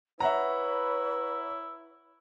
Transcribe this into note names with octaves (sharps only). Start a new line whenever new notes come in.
E4 B4 C#5 E5 F#5 A#5